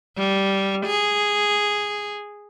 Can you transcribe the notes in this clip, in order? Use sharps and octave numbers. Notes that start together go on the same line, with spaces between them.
G3
G#4